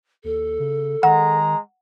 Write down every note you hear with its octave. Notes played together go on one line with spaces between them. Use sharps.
D#2 A4
C#3
D#3 G#3 F#5 A#5